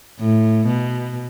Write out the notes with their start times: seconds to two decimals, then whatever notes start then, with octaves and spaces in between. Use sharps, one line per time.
0.19 A2
0.67 B2